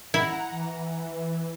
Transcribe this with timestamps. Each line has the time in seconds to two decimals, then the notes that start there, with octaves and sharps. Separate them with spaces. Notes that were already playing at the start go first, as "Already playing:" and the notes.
0.14 E4 F#5 A#5
0.51 E3